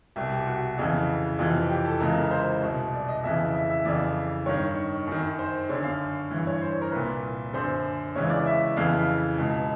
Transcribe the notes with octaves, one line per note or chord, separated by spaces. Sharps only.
C2 B2 G4
G4
F#4
F2 C#3 E3
F2 C3 E3 F4
G4
A4
C#2 C#3 E3 A#4
C5
C2 B2
D5
D#5
F2 C#3 E3 E5
E5
E5
F2 C#3 E3 D5
G2 D#3 C#5
F#2 D#3
C5
F#2 D3 C#5
F5
G2 E3
C#5
C5
C#5
A#4
C2 A#2 B4
F#2 D3 C5
C#2 C#3 E3 C#5
D5
E5
F2 C#3 E3 F5
C#2 B2